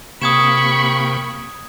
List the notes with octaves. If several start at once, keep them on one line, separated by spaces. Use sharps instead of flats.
C3 A#3 G5 B5 C#6 D#6 G#6 E7